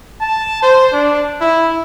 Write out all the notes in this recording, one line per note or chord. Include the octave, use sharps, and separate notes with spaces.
A5
C5
D4
E4